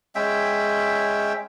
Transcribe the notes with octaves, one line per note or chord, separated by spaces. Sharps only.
G#3 C#4 E5 G5